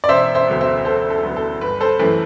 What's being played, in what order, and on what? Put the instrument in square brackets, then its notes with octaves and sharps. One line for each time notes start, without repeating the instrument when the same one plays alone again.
[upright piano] D5
E1 C5 E5
C5 E5
D2 D3 F#3 B3
C5 E5
E1 A4 C5
A4
D2 D3 F#3 B3
A4
G1 B4
A4 C5
F#2 E3 A3 B4